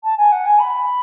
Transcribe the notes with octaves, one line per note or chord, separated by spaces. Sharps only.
A5
G#5
F#5
G#5
B5